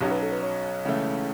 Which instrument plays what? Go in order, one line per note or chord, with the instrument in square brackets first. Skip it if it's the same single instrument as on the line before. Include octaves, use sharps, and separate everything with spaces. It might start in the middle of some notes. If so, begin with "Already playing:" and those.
[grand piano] B1 B2 F#3 C#4 [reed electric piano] G4
[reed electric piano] B4
A4
B4
C#5
[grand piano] C#2 C#3 E3 A3